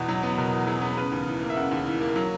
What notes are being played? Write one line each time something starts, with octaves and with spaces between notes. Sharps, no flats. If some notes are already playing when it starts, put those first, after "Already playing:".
Already playing: E2 B2 B4
F#3
B3
B2 A#4
E2
F#3 G#4
B3
C#3 B4
D#2
E3
A#3
E5
C#3 F#5
D#2
E3
A#3
F#3